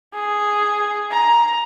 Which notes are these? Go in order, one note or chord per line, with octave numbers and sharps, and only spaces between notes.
G#4
A#5